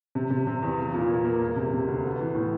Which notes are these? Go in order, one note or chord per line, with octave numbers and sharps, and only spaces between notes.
C3
C3
C3
E2
B1
A#2
A#3
A#3
E1
C3
C3
D2
B3
E3
A2